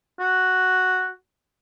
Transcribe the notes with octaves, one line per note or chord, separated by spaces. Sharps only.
F#4